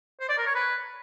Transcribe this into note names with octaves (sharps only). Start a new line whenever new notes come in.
C5
D5
A#4
C#5
B4